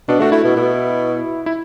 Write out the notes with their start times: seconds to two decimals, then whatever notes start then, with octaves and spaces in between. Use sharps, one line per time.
0.08 B2 D4
0.20 A3 F#4
0.32 A3 E4
0.44 B2
0.56 B2
1.46 E4